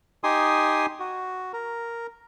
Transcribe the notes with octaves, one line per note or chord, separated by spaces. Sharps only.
D#4 G4 G#5 C6 D#6
F#4
A#4